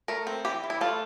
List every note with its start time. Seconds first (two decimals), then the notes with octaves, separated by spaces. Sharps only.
0.08 A3 A#4
0.27 C4
0.45 E3 G4
0.64 E3
0.70 E4
0.81 A3 F4